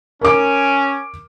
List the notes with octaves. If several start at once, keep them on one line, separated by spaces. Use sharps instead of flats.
C#4 A#4 D6